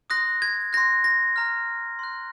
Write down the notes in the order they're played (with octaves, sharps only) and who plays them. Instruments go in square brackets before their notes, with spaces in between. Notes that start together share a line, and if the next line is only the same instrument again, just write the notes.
[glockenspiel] C6 D#6 F#6 A#6
G#6
C6 F#6 A#6
A#6
A#5 F6
C6 F#6